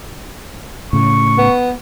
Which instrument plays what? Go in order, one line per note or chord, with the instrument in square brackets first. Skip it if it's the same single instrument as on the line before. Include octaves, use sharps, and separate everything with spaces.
[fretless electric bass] A2 C#3 [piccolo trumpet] C#6
[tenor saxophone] B3